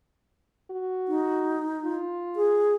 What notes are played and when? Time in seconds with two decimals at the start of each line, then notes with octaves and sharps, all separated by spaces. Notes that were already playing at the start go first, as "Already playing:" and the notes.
0.70 F#4
1.08 D#4
1.84 F4
2.36 G#4